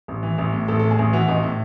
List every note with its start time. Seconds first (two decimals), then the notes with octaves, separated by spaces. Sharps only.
0.08 A1
0.23 E3
0.38 A1
0.53 A2
0.68 A1 A4
0.79 A2 A4
0.91 G#4
0.99 A1
1.13 E3 F#4
1.28 A1 D#4
1.43 A2